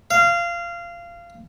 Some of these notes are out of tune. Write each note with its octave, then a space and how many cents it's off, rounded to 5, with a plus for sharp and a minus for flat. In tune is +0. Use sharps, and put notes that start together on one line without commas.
F5 -20